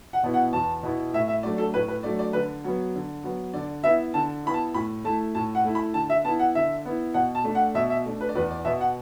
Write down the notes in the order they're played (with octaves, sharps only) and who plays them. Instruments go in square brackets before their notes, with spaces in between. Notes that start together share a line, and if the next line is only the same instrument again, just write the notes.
[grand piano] F#5
B2 B3 E4
F#5
E2 A5
B2 B3 E4
A2 E5
E5
F#3 A3 D4 D5
A4
A2 B4
B4
F#3 A3 D4 D5
D5
D3 B4
F#3 B3
D3
F#3 B3
D3 D5
B3 E4 E5
D3 A5
B3 E4 B5
A5
A2 B5
A3 E4 A5
A2 A5
F#5
A3 E4
B5
D3 A5
E5
B3 A5
E4
F#5
D3 E5
B3 E4
B2 F#5
A5
A3 D4
F#5
B2 E5
E5
A3 D4
B4
D5
E2 B4
D5
B2 B3 E5
F#5